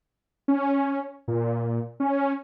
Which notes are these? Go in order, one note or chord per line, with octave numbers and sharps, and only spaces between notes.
C#4
A#2
C#4